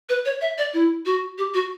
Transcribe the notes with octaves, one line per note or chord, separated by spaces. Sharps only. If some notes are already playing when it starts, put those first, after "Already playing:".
B4
C#5
E5
D5
E4
F#4
G4
F#4